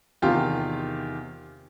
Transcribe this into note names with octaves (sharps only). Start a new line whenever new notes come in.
E2 C3 D#3 F4 G4